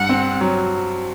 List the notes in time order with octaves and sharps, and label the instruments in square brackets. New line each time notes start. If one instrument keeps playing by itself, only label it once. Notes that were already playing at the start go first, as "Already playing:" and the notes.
Already playing: [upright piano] G2 [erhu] F#5
[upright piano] C4
F#3